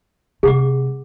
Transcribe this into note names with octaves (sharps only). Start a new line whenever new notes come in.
C3 G#3 G#4 F#5 D6